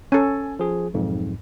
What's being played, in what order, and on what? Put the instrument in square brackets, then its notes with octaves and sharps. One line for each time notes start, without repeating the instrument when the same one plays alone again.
[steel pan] C#4 A4 [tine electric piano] G#5
[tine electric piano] F3 G#4
B1 F2 G#2